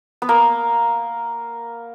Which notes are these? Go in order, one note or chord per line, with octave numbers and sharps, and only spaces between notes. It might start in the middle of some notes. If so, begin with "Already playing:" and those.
B3
A#3